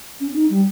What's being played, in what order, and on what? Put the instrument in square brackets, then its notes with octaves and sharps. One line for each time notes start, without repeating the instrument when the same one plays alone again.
[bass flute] C#4
C#4
D#4
G3